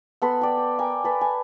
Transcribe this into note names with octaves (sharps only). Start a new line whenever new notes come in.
B3 A4 B5 C6
D5 G5
G5
A#4 G5 G#5 D6
A4 B4 B5
G#5